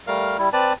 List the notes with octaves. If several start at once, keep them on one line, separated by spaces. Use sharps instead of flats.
G3 A3 A#4 F5
G3 E4
C4 B4 D5 A5